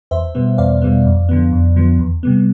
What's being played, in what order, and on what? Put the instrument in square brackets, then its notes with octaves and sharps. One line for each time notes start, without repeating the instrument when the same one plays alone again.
[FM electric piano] E2 C5 E5
B2 G3 B3
E2 D5 F5
B2 G3 B3
F2
D3 F3 B3
F2
D3 F3 B3
E2
C3 G3 B3